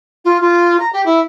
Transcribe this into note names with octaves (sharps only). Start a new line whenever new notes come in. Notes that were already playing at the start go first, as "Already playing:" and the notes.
F4
F4
A#5
G4
E4